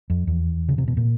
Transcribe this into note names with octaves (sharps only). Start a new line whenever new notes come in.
F2
E2
C#3
C3
B2
A#2